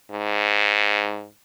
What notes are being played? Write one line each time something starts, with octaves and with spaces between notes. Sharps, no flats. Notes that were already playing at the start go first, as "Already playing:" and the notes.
G#2